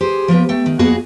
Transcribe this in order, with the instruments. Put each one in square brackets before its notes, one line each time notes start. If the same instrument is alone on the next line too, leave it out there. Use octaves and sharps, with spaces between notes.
[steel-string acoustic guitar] G4 G#4 C5
F3 A#3 B3 G4
A3 G5
D#3
F2 A#3 B3 F#4 G#4 D#5